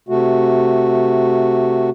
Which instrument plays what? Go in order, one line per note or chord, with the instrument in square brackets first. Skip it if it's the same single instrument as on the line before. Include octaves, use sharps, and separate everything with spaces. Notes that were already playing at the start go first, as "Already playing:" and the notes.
[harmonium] C3 A3 F#4